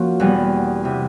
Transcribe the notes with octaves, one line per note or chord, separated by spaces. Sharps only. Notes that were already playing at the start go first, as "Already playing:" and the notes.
Already playing: F3 A#3 C#4 F#4
E2 B2 G3 B3
C3 E3